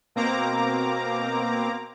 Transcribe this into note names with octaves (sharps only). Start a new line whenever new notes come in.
B2 A#3 C4 A#5 D6